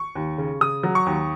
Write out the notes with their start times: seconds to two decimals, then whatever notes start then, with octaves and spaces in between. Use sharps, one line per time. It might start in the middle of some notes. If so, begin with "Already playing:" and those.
Already playing: C#6
0.15 D#2
0.38 C#3
0.61 C#3 D#6
0.83 F#3
0.95 C#6
1.06 D#2